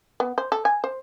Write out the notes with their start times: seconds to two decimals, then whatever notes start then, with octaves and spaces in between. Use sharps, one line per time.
0.20 B3
0.38 C5
0.52 A4
0.65 G#5
0.84 C5